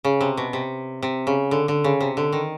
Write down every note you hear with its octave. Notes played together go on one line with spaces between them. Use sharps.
C#3
C3
B2
C3
C3
C#3
D3
D3
C#3
C3
D3
D#3